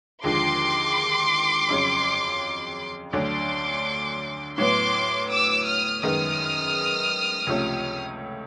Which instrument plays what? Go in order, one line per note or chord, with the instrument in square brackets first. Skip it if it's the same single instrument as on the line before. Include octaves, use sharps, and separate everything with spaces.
[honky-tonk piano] D#2 D3 F3 G#3 [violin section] C6 D6
[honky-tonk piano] F2 C#3 F#3
[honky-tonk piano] D2 D3 F#3 A3 D4 [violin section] C6 D6
[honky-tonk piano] A2 F#3 B3 [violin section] C6 D6
[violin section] D6 E6
D#6 F6
[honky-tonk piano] F#2 D#3 G#3 B3 [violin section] D#6 F6
[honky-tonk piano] C#2 C3 F3 A3 C#4